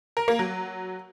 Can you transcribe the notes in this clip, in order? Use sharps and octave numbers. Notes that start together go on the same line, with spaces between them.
A#4
A#3
F#3